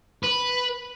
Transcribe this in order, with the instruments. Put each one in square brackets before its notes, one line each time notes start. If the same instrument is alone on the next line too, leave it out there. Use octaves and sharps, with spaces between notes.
[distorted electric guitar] B4